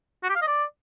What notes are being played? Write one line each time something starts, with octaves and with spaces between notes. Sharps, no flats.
F#4
G4
F5
D#5
D5